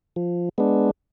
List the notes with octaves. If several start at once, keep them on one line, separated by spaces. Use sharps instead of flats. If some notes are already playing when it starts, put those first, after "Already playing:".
F3
G#3 B3 D4